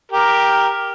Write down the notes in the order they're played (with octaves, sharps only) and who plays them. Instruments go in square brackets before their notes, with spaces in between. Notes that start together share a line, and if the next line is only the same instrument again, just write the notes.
[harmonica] G4 A#4